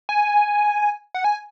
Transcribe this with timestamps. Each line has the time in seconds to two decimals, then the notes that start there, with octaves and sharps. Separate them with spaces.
0.09 G#5
1.14 F#5
1.24 G#5